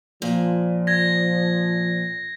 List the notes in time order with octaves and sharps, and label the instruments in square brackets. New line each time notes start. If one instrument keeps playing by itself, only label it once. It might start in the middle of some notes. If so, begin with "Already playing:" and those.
[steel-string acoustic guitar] A#2 [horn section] F3
[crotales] G#6 A#6